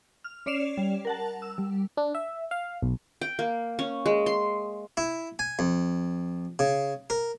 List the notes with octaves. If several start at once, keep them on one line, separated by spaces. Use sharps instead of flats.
F6
C#4 C#5 D5 C7 E7 F7
G3
A#4 F#5 A5
E6
G3
D4
E5
F5
B1
G5
A#3
C#4
G#3
C6
E4
G#5
F2
C#3
A#4